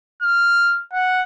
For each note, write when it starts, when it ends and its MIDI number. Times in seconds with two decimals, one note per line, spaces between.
0.23 0.82 89
0.94 1.22 78